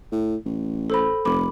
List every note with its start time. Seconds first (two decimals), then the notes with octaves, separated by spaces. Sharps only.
0.12 A2
0.45 A1
0.90 A4 C5 B5
1.25 F1 B5 D6